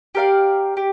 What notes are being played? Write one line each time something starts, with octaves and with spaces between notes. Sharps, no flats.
G4 A#4 D5 F5
G4